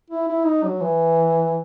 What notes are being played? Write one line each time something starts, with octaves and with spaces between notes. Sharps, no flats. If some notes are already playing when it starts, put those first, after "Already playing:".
E4
E4
D#4
F#3
E3